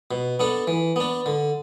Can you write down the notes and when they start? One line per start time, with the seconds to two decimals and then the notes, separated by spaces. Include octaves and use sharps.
0.11 B2
0.40 B3 D4 A4
0.67 E3
0.96 B3 D4
1.26 D3